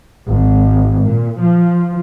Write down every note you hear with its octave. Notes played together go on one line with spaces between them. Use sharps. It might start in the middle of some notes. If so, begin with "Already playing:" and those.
G#1
A#2
F3